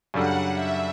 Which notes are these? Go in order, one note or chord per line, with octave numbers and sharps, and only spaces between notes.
F#2 C#3 G3 D4 A4 F#5
E5